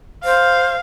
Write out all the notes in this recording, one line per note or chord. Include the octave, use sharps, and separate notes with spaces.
C5 F5